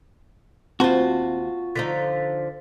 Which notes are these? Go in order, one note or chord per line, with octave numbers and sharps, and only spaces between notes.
D#2 C4 F4 F#4 C5
D3 F3 D#4 A6 B6